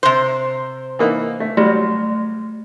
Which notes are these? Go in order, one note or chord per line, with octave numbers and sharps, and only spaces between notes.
C3 C5
E3 A#3 D#4
A3
F#3 G3 A3